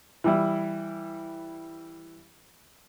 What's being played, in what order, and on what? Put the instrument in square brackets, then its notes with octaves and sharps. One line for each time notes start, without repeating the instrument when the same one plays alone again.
[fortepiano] E3 G3 E4